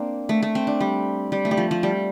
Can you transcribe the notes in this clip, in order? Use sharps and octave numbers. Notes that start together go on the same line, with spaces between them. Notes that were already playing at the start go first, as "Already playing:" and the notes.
Already playing: A#3 C4 D4
A3
A3
C4
D4
G3
G3
A3
G3
F3
F3
G3